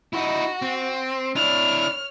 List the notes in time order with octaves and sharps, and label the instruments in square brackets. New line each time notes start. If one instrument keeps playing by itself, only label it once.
[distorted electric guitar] D#4 E4 [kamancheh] F#4
[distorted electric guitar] C4
[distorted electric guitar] D4 E4 [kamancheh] C#5 F6